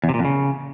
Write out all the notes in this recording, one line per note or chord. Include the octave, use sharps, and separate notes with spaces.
E2
C3
A#2
F2
C#3